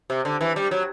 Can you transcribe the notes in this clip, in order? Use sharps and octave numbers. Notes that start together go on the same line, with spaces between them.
C3
D3
E3
G3
F#3